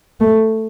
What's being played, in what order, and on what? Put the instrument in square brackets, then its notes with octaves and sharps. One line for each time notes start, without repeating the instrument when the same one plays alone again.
[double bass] A3